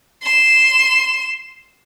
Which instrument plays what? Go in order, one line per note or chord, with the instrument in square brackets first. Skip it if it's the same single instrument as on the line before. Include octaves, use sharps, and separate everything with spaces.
[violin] C6 E7